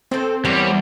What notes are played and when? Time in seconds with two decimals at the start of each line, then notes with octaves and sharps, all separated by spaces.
0.11 B2 C4 A4
0.45 E2 F#3 G3 A#3 C#5